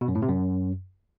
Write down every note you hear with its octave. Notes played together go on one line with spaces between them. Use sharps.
B2
F#2
A2
C3
F#2